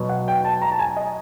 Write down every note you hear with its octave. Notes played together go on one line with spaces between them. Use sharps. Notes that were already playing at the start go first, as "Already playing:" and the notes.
Already playing: B2 F#3 B3
F#5
G5
A5
A#5
A5
G#5
D#5